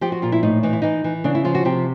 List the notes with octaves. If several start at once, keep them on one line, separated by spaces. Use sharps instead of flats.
F3 G4
F#4
A#2 F4
E4
A2 D#4
E3 D#4
E4
E3 D#4
E3
C#3 D4
E4
F3 F4
F#4
C3 G4